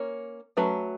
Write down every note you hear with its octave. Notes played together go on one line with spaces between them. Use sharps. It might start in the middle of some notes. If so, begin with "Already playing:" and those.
Already playing: A#3 C#4
F#3 A3 C#4 B4